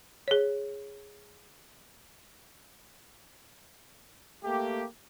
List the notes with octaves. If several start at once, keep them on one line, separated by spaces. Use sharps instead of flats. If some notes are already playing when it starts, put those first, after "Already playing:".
G#4 C#5
A3 A#3 G4